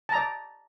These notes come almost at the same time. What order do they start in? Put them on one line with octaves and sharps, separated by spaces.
A5 A#5 D5